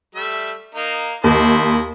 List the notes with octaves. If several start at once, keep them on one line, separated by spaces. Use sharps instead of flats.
G3 A3 E5
A#3 D#4
D#2 E4 C5 D#5